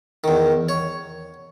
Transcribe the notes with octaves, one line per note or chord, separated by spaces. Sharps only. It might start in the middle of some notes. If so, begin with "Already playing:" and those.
E2 D#3
C#5